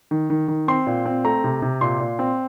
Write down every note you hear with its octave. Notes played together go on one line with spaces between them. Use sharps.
D#3
D#3
D#3
C4 C6
A#2
C4
A3 A#5
C3
C3
A#2 C6
A#2
C4